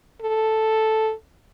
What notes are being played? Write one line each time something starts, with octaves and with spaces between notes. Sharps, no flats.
A4